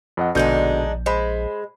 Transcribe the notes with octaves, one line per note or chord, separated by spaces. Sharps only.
F2 D#5 F#5
A#1 B2 D3 G#3 D4 D#4 G6
G#3 C5 B5